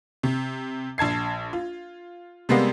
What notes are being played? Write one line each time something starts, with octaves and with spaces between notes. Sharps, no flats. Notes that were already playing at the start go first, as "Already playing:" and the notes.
C3
A#1 A5 G#6 C7
F4
C3 G3 G#3 A#3 B3